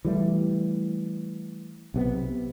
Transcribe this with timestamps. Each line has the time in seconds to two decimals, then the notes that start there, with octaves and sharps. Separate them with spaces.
0.05 E3 G3 A3
1.94 B1 C3 B3